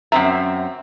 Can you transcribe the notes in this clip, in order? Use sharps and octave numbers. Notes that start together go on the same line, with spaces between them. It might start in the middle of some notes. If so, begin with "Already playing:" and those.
F#2 C4 E5 A#5